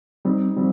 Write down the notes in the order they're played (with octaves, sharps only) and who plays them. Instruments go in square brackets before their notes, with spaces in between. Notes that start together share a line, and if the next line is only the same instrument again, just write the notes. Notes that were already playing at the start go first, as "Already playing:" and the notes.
[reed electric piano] G3 C4 [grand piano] D#4
[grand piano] F3 [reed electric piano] G3 C4